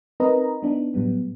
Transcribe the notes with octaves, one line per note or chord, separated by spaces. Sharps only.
C4 D#4 A#4 B4 D#5 A#5
B3 D4 D#4
A2 F#3 G3 B3